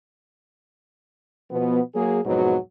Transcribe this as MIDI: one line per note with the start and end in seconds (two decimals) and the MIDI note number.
1.50 1.80 47
1.50 1.80 53
1.50 1.80 59
1.95 2.19 54
1.95 2.19 58
1.95 2.19 68
2.24 2.56 41
2.24 2.56 44
2.24 2.56 47
2.24 2.56 54